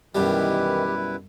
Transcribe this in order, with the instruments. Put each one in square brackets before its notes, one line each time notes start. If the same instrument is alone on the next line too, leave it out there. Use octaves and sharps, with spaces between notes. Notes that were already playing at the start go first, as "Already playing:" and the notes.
[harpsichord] F#2 B2 G3 [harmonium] D#3 E3 [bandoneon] E4 B4 [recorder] G4